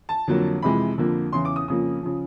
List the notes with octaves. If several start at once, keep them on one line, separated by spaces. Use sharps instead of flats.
A5
F2 D3 F#3 A#3
F2 C3 E3 G#3 B5
F2 D3 F3 A#3
E2 C#3 E3 C6
D6
D#6
F2 C#3 F3 A#3 D#6
C#3 F3